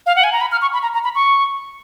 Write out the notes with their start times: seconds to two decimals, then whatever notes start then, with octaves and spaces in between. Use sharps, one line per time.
0.06 F5
0.16 F#5
0.24 G#5
0.32 A#5
0.41 B5
0.52 F6
0.62 C#6
0.73 B5
0.83 A#5
0.94 A#5
1.04 B5
1.15 C#6